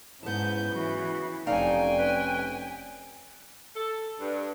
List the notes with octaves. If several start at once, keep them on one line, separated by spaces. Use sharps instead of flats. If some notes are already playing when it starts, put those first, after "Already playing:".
G#2 C#3 B3 E4 A5 G6
E3 F#4
F1 A3 C#4 D#4 D5 F5 G5 G#5
B4
A4
G2